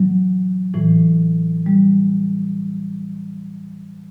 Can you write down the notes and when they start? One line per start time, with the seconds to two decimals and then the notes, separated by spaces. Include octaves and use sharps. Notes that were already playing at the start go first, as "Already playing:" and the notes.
Already playing: A2 E3 F#3
0.74 A2 E3
1.66 G3